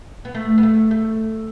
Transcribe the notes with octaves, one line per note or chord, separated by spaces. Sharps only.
B3
A3
B3
A3
A3